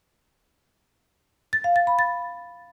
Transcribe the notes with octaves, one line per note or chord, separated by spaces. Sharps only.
A6
F5
A6
B5
A6